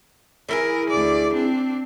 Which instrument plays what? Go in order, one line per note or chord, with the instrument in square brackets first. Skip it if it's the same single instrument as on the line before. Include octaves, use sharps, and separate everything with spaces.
[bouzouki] E3 E4 G#4 [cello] A#4
[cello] D2 D5
C4 D4